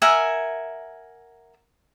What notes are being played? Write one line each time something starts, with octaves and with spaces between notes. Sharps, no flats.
A#4 E5 F#5 G#5